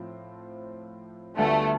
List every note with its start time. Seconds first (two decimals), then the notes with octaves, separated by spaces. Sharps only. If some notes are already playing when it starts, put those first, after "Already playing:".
Already playing: A2 F3 C4 F4
1.37 D2 D3 G3 A3 B3 F4